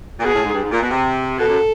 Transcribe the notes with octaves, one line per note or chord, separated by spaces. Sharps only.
A#2
B2 G#4
A2
G#2
G2
G#2
A#2
B2
C3
B2 A4
F#2